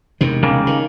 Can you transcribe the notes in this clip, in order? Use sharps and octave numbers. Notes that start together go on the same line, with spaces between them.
E1 C3 D#3
C#3 G3 A#3
D#3